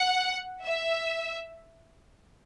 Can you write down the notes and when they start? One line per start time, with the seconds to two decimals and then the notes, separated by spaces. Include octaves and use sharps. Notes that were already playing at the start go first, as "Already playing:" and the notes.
Already playing: F#5
0.64 E5